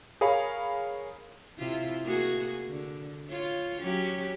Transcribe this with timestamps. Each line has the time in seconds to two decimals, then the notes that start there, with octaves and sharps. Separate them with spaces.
0.21 G#4 A#4 C#5 F5 B5
1.58 C3 E4 F4
2.05 A#3 F#4 G#4
2.67 D3
3.28 F4 C#5
3.82 F#3 C#4 G4